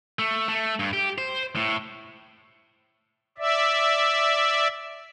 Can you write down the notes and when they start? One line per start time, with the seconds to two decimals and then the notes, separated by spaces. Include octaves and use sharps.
0.19 A3
0.49 A3
0.80 G2
0.93 G4
1.18 C5
1.56 A2
3.38 D5 E5